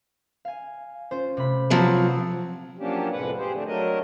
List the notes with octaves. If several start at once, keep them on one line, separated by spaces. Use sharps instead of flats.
F5 G#5
C#4 F4 C5
C3 A3 B5
F3 F#3 C4
F3 F#3 A#3 C#4 D4 G4
F2 A2 C3 G#3 B4 F#5
G4 G#4 C5
D3 A3 C4 D4
F#3 A3 D4 A#4 D#5